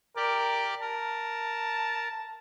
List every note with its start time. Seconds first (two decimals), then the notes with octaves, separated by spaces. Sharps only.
0.16 G4 A#4 D5
0.81 A#4 A5